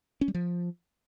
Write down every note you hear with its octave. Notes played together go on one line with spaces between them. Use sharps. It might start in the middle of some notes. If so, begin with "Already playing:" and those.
C#4
G3
F3